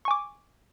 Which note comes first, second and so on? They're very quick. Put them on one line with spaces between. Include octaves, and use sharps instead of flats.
C#6 G#5 D6